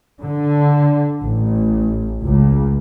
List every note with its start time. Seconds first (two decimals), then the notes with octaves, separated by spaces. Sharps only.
0.23 D3
1.22 A1
2.22 C#2